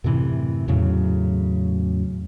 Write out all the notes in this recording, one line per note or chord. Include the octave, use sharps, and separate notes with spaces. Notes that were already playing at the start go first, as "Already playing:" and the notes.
F#2 A2 C3 E3
E2 A2 C#3 F#3